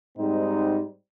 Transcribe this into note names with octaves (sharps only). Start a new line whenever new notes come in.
G#2 G3 C4 D#4